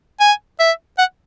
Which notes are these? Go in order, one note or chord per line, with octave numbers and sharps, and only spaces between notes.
G#5
E5
F#5